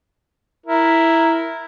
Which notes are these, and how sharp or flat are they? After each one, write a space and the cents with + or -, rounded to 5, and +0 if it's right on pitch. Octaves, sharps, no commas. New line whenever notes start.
E4 +0 A#4 +0